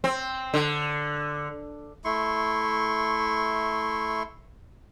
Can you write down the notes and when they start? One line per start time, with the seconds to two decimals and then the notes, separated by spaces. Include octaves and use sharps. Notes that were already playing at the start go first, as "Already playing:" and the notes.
0.04 C4
0.54 D3
2.05 A3 E4 C6 C#6